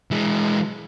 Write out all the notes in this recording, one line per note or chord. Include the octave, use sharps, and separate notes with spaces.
E3 G#3